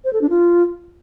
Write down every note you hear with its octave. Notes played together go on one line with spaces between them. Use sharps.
C5
A4
D4
F4